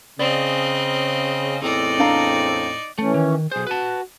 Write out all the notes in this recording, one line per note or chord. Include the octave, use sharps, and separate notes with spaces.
C#3 C4 D5 D#5
E2 A2 C4 D#4 D5
D4 F5 A#5
E3 A3 C#4
D#3
B1 G#4 C5
F#4 B4 A5